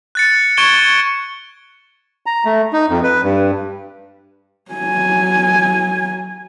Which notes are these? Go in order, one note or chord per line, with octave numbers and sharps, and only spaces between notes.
F#6 A6 C#7
C#6 G#6 D7 E7 G7
A#5
A3
D#4
F2
B4
G2
F#3 G#5